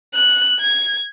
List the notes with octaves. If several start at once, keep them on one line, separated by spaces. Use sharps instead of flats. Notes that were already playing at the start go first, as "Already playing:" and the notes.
F#6
G#6